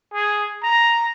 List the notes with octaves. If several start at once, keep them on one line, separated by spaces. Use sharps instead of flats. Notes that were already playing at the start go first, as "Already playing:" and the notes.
G#4
A#5